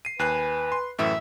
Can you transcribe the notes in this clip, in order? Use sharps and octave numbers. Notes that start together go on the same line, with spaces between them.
C7 D#7
D#2 B4 G#5 F#6 C7
C6
F#2 A2 E3 E5